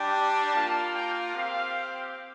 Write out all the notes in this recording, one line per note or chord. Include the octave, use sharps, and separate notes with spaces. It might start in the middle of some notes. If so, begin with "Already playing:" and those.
Already playing: G3 D4 G4
A#3 F4 A5
G5
C4 G4 F5